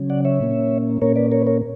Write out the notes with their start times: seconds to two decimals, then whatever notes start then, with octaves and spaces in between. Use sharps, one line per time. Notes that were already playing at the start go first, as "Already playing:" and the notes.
Already playing: C#3 F#3 C#4
0.10 D5 F#5
0.25 C#5 E5
0.40 A#2 A#3 C#4
1.02 A#2 A#3 C#4 A#4 C#5
1.16 B4 D5
1.32 A#4 C#5
1.42 B4
1.47 A#4 C#5